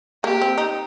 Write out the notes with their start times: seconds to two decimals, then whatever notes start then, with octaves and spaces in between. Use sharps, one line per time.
0.24 A#3 G4
0.42 C4
0.58 D#4